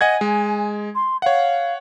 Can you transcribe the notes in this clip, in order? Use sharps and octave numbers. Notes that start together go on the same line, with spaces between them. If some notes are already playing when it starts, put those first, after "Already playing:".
D#5 F#5 G#5 G#6
G#3
C6
C#5 F5 F#5